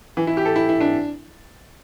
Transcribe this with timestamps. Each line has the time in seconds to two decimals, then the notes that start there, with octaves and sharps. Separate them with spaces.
0.17 E3
0.27 E4
0.37 G4
0.45 A4
0.56 E4
0.69 E4
0.81 D4